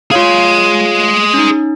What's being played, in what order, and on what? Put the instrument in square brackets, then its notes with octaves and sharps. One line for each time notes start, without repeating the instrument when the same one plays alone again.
[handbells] F4 C#5 F5 [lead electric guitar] G#4 C6
[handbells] C#4 D#4